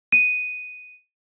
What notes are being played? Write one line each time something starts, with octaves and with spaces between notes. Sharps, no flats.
D#7